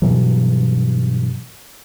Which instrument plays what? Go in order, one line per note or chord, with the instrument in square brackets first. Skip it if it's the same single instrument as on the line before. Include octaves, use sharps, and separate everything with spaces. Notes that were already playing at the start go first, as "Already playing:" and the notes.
[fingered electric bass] G2 B2 E3 F#3